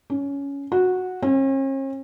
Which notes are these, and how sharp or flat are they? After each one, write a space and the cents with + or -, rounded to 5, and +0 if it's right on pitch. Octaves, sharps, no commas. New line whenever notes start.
C#4 +15
F#4 -10
C#4 -45